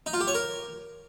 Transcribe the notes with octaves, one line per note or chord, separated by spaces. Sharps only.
D#4
F4
G4
C#5
A#4